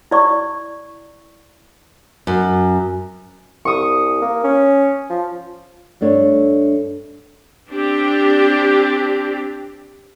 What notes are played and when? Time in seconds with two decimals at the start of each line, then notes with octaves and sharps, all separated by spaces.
0.11 E4 D5 C#6
2.27 F#2
3.65 C2 C#6 D#6
4.22 A#3
4.44 C#4
5.10 F3
6.01 G2 A3 D4 C#5
7.72 C4 D4 G4